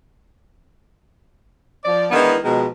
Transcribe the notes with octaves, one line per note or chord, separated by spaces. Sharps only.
F3 D5
D#3 E3 G#3 B3 D4 E4
B2 D#3 F3 G#3